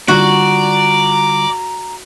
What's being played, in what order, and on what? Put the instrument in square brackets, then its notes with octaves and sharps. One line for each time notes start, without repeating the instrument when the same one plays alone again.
[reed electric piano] D3 G3 F4 [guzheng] F#4 [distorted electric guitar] D5 [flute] A#5